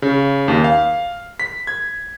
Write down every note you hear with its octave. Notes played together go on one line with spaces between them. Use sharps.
C#3
D#2
F5
B6
G#6